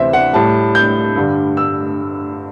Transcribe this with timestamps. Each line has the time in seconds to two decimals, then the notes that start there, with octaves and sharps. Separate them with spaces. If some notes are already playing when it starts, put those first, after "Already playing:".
Already playing: D2 C3 E3 C5 E5
0.13 F#5
0.33 A2 G3 A5
0.75 G6
1.16 G2 D3 G3
1.57 E6